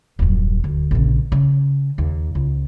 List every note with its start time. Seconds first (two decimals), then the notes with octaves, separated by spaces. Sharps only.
0.19 D#1 F#2
0.64 D2
0.91 A#1 C#3
1.32 C#3
1.98 D#2
2.35 C#2